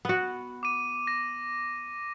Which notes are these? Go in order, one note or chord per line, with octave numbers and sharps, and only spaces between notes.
B3 F#4
D6 D#7
A#6